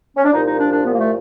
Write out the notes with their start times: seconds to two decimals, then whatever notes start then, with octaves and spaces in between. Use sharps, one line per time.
0.16 C#4
0.24 D4
0.32 C2 A#2 F3 D#4
0.46 D#4
0.60 D4
0.73 D4
0.86 B3
0.93 A#3
0.98 A3